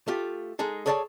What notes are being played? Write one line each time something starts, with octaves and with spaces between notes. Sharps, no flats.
A3 F4 G4
G#3 D#4 G#4 A4
G#4 A4 C#5 D5 F#5 A5